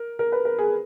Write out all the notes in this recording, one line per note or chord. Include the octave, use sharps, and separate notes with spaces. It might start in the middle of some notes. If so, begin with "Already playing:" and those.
Already playing: A#4
A#4
B4
A#4
G#4